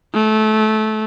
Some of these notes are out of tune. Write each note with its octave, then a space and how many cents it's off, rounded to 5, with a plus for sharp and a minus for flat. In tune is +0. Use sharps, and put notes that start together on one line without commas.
A3 -20